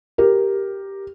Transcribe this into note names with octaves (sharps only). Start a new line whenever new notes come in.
G4 A#4